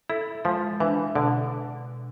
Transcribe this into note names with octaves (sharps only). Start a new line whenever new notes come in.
E4 A4
F3 G#3
E3 D4
B2 D3